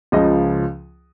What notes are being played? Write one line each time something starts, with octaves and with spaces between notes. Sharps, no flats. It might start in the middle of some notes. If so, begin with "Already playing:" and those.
C#2 C#3 F3 D#5